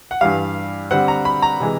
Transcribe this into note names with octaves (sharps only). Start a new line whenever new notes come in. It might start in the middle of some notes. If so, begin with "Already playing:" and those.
F#5
G2 E3 G3 F5
D3 G3 C4 F#5
A#5
B5
A#5
C3 E3 G#3